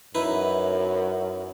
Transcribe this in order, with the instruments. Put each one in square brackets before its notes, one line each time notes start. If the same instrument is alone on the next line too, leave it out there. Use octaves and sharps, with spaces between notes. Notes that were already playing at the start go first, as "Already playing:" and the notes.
[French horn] F#2 [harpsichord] D#4 E4 B4